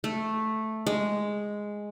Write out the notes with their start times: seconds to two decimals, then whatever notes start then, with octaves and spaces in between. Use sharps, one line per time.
0.04 A3
0.86 G#3